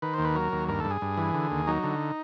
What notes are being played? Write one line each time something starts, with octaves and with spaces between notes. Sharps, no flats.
D#3 B4
D#2 C5
B4
F#3 A#4
D#2
G2 A#4
G2 A4
G#4
G2
E3
D3
D#2
F#3 D#4
D3